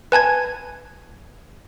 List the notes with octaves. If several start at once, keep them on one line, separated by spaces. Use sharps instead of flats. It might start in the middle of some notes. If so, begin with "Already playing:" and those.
B4 G#5 A5 G#6